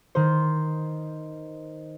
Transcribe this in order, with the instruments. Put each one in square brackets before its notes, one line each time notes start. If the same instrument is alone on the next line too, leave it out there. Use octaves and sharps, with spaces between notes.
[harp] D#3 C5